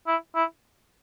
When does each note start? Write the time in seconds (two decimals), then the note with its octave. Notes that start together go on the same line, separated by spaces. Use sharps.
0.07 E4
0.35 E4